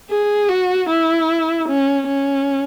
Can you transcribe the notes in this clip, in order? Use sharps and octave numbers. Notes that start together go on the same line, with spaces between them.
G#4
F#4
E4
C#4
C#4